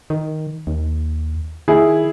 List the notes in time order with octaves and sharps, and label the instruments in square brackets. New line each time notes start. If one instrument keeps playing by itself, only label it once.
[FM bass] D#3
D#2
[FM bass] D#3 [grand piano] E4 G#4